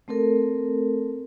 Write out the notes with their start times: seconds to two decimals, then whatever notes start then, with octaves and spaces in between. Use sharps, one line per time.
0.08 A3 C4 A4 A#4